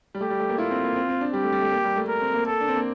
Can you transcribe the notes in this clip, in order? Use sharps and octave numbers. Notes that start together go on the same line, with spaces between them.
G3
A3 G4
G3
A3
A#3
E4 F4
C4
A#3
C4
C4
D4
G3 G4
A3
G3
A3
A#3
G3
A3
A#4
C4
A#3
A4
D4
C4
A#3